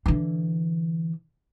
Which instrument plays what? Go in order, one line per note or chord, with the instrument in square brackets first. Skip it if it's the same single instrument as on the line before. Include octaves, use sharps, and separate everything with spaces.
[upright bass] D3 E3